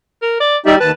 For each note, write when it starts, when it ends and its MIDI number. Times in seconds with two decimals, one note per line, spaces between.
0.22 0.36 70
0.40 0.57 74
0.66 0.79 55
0.66 0.75 63
0.66 0.75 67
0.66 0.75 76
0.80 0.91 39
0.80 0.90 71
0.80 0.91 81